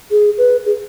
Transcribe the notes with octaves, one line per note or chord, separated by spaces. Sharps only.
G#4
B4
G#4